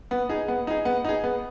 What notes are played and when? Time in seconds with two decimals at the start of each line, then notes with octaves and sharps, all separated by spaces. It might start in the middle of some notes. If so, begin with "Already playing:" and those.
0.11 B3
0.29 D#4 G#4
0.48 B3
0.67 D#4 G#4
0.85 B3
1.05 D#4 G#4
1.24 B3